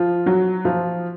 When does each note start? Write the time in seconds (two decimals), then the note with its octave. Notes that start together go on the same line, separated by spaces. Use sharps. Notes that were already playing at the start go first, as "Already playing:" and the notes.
Already playing: F3 F4
0.26 F#3 F#4
0.65 F3 F4